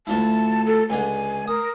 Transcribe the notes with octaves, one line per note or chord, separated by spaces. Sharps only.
D2 F3 E4 A5
A4
C#2 D3 G#5
A#4 D#6